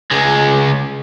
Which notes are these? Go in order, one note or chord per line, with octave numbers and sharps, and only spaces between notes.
C#2 G#3